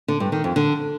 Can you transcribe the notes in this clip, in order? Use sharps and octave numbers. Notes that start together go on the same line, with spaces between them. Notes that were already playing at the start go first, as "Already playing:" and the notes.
D3
G2
D#3
F2
D3